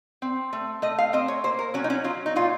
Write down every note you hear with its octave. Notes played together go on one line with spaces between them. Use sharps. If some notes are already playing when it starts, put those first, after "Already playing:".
C4
A3
A3 D#5
F5
C4 D#5
C#5
A#3 C5
A#4
F#3 C#4
D#4
C#4
F#3 F4
D#4
A#2 F4